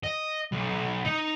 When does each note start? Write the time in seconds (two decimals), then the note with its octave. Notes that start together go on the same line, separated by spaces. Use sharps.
0.03 D#5
0.52 B1
1.05 D#4